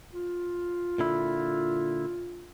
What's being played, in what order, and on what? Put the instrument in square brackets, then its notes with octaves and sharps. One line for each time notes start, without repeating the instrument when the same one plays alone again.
[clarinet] F4
[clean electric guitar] A#2 D3 E4